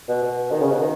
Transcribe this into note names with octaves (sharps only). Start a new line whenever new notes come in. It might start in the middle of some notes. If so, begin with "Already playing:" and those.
B2
B2
D#3
C#3
B2
D#3